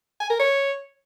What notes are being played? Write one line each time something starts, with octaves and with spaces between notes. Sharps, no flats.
G#5
A#4
C#5